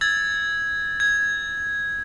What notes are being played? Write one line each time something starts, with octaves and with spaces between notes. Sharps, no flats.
E6 G#6 A6
G#6